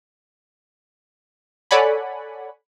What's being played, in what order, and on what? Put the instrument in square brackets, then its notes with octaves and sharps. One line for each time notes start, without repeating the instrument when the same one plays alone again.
[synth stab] A4 C#5 D5 F#5 G#5 B5